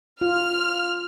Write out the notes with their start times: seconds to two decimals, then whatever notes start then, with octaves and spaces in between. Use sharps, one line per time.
0.21 F4 F6